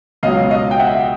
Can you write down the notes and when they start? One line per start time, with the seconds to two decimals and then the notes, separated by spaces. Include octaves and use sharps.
0.23 C#2 B2 F#3 D#5 F5
0.51 D#5 F5
0.71 G5
0.79 E5 F#5